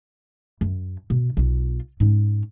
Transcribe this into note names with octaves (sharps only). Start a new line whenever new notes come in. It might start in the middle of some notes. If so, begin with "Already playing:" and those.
F#2
B2
B1 F4
G#2 C#4